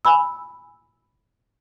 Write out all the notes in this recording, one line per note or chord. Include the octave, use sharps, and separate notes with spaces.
G#5 B5 E6